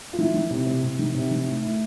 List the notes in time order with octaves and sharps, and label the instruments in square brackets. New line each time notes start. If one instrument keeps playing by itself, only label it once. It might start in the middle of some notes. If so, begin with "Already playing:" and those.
[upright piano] F4
D#3 E4
D#3
C3
C3
C3
D#3
C3
D#3
A2
A2